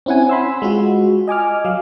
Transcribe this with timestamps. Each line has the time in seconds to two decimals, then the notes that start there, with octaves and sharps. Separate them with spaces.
0.06 C4 C#4 E4 F#5 G#5
0.29 B5 C6 E6
0.62 G#3 F4 F#4
1.28 D#5 G#5 D6 F6
1.65 F#3 F5